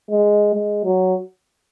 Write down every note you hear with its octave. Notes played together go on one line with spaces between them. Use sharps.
G#3
G#3
F#3